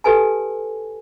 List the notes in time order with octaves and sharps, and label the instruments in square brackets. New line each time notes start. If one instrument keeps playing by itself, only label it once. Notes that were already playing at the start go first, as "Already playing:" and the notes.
[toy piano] G4 A4 B4 G#5 A5